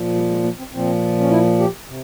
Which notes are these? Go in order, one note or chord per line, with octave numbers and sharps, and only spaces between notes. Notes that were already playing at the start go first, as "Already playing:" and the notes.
Already playing: A#2 F3
G3
G#3
A#3
C4
A#2 F3 C4
C#4
E4
G4
C3